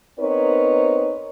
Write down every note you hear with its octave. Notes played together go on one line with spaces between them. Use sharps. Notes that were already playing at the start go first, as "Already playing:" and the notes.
B3 C4 D#4 A#4 B4 C#5